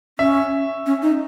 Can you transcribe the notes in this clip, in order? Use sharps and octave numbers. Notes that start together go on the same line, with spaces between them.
C#4 E5
C#4
D#4